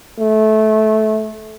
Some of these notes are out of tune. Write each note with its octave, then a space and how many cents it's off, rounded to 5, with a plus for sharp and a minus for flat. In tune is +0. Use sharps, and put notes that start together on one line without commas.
A3 -20